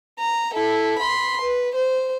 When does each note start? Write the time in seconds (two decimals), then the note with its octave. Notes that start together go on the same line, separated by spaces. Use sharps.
0.19 A#5
0.54 E4 A4
0.99 B5 C6
1.41 B4
1.75 C5